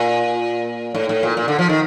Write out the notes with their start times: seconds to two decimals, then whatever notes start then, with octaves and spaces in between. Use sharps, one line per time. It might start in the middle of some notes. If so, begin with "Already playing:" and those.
Already playing: A#2
0.95 A2
1.09 A2
1.23 A#2
1.37 A#2
1.48 D3
1.59 F3
1.69 D#3